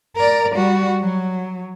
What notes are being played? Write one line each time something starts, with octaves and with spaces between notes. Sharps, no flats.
A#4 D5
G3 F#4
F#3